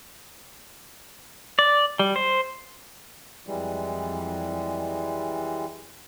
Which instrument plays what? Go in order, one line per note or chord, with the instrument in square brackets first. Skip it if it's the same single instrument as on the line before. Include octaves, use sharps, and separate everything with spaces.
[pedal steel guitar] D5
G3
C5
[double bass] F2 [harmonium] E3 G3 G#3